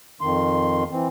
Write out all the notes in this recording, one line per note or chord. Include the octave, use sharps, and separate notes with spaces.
F2 D#3 C6
E3 C4